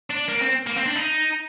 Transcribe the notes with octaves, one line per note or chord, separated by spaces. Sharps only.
D4
A#3
C4
A#3
C4
D4
D#4